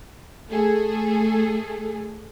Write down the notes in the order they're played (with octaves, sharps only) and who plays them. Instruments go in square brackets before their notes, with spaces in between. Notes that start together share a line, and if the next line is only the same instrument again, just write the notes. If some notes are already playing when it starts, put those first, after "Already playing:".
[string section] A3 G#4 A4